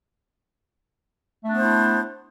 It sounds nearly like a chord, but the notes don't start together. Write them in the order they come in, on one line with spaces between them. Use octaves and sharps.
A3 D4 B3 C5 E4